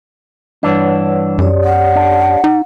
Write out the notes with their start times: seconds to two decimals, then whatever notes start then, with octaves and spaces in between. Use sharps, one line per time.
0.63 G2 E3 D4 B4 C#5 F#5
1.38 F#2 G4 C#5 D5
1.64 F#5
1.96 D4
2.44 D#4